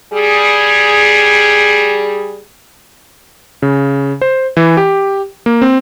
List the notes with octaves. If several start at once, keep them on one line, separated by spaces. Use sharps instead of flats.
G3 G#4
C#3
C5
E3
G4
A#3
C4